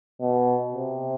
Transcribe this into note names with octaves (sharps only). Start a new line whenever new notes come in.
B2
C3